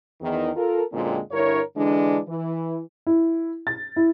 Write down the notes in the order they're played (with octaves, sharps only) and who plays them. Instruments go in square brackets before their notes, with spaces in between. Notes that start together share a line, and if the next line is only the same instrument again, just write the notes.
[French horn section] E2 D#3
F4 A4 A#4
F#2 A#2 D3 G#3 C4
G2 D3 E4 A#4 C#5
D3 E3 G#3 D4
E3
[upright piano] E4
A6
E4